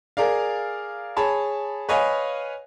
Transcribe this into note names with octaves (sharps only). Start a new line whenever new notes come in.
G#4 A#4 D5 F5
G#4 C#5 A5 B5
B4 C#5 D#5 F5 G#5